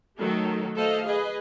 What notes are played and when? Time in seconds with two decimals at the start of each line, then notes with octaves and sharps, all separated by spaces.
0.19 D#3 F#3 A3 A4
0.76 A3 A4 C5 D#5 F5
1.06 G#4 B4 D#5